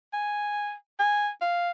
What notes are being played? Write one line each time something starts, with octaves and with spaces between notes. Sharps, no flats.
G#5
G#5
F5